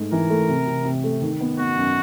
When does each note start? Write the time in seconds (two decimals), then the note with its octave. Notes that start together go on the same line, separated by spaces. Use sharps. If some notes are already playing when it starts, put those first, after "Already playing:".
Already playing: G#2 A3
0.12 E3 A#4
0.30 A3
0.48 C3
0.67 C3
0.84 C3
1.04 A3
1.21 D#3
1.41 B3
1.58 B3 F#4
1.77 F#2